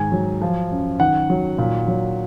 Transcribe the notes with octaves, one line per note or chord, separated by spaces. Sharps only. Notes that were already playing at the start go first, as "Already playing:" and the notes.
Already playing: G#2 D#3 G#5
F#3
F3
F#2
D#3 F#5
F#3
A#2
F#3